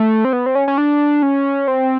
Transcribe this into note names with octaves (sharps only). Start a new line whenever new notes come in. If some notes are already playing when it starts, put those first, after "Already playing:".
Already playing: A3
C4
B3
C4
C#4
C#4
D4
C#4
C4